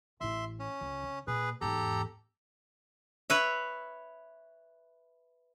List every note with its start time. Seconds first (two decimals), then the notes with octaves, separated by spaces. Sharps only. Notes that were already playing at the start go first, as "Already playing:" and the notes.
0.21 A1 E4 E5 C6
0.59 C#4
0.81 C#2
1.03 C#3
1.27 A#2 G#4 B4
1.61 E2 G#2 G4 A4 A#5
3.30 B4 C#5 E5